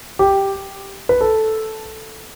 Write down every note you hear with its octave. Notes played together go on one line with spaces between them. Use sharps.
G4
B4
A4